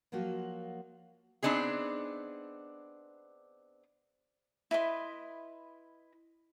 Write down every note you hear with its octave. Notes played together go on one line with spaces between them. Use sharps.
F3 F#3 A#3 F4 F#4
B3 C4 D4 D#4 G#4
E4 B4 D#5 C6